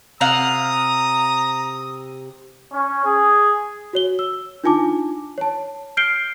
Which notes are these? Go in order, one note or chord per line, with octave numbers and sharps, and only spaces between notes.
C3 F5 F#5 A#5 D#6
C#4
G#4
F#4 C#5 G7
E6
D4 D#4 F4 G#5 A5 D6
C#5 A5
F6 G6 C7 D7 G7